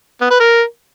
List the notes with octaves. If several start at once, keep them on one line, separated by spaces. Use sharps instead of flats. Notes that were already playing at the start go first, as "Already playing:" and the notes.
B3
B4
A#4